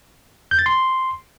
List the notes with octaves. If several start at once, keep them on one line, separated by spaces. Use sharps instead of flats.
G6
A6
C6